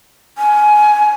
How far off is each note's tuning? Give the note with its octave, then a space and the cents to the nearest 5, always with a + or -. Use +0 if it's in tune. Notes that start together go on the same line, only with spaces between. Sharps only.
G#5 +15